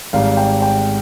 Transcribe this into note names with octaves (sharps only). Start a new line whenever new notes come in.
G#1 G#2 G3 F5
G5
G5